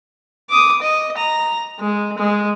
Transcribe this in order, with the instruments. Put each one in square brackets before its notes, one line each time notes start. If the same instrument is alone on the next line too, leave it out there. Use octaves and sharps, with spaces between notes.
[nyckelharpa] D6 D#6
D#5
A#5
G#3
G#3